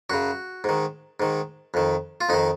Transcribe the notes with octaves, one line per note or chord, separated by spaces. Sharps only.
F#2 C#3 F#4
G#2 D#3
G#2 D#3
F2 D#3
F4
F2 D#3 D#4